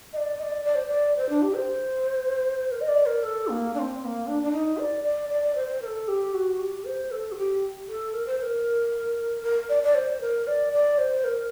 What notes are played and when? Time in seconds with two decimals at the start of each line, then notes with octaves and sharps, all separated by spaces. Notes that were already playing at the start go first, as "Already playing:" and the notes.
0.13 D#5
0.16 D5
0.38 D#5
0.43 D5
0.64 D5
0.75 C5
0.86 D5
1.16 C5
1.29 D4
1.42 G4
1.54 C5
2.71 A#4
2.80 D#5
2.88 D5
3.06 A#4
3.23 A4
3.48 A#3
3.74 D4
3.79 C4
4.00 C4
4.04 A#3
4.27 D4
4.42 D4
4.52 D#4
4.78 D5
5.03 D5
5.29 D5
5.43 D5
5.55 C5
5.68 C5
5.81 A#4
5.86 A4
6.08 G4
6.33 F#4
6.59 G4
6.84 C5
7.11 A4
7.31 F#4
7.36 G4
7.88 A4
8.13 A#4
8.26 C5
8.38 C5
8.42 A#4
9.43 A#4
9.69 D5
9.83 D5
9.94 C5
10.21 A#4
10.47 D5
10.73 D5
10.98 C5
11.24 A#4